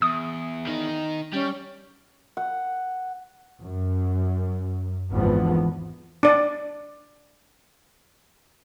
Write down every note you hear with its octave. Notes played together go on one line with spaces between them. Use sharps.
E2 D#6
D#3 D#4
G3 C#4 G5
F#5
F#2
G#1 E2 D3 E3 F3 B3
D4 D5